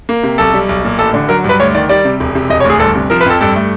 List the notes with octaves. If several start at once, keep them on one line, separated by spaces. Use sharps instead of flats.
A#3
C3
B1 A4
G3
B1
A#2
A1 A4
D3
F#3 A#4
G2 B4
D2 C#5
D#3 D5
G3 D5
C3
E1
C3
E1 D#5
C#5
D2
G#4
G1 A4
C3
F3 A#4
B4
F2 A4
G2 A4
A3